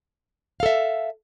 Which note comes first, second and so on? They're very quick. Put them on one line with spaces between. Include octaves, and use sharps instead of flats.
F5 A4 E5